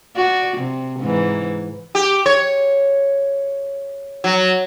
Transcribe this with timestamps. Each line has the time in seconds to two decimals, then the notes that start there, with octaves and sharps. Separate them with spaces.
0.16 F#4 D5
0.57 C3
1.00 G#2 E3
1.95 G4
2.26 C#5
4.24 F#3